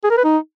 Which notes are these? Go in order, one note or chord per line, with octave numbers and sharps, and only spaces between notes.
G#4
A#4
B4
D#4